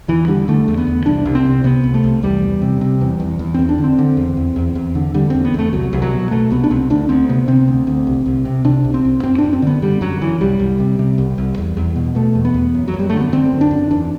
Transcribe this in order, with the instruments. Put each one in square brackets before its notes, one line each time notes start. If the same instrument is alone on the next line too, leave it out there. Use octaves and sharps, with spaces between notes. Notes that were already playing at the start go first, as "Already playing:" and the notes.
[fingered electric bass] E2 E3
D3 G3
D3 A3
E2
B3
E2
C2 D4
C2
C4
C3
C3 B3
C2
A3
C2
E2 G3
E2
C3
C3
E2
E2
E2
E2 C4
D4
D3
C4
D3
E2
E2
E2
E2
D3
D3 G3
E2 C4
B3
E2 A3
C2 F#3
C2
F#3
B2
B2 A3
C2 B3
D4
C2 C4
D2 D4
D2 C4
C3 B3
C3 C4
D2
D2
C2
C2
C3
C3 D4
C2
C4
C2
F#2 C4
D4
F#2
C4
D3 B3
D3 G3
F#2 F#3
F#2 E3
C2 G3
C2
C3
C3
C2
C2
E2
E2
B2
B2 A3
E2
B3
E2
F#2
F#3
F#2
G3
D3 A3
B3
D3 C4
F#2
D4
F#2
E2 D4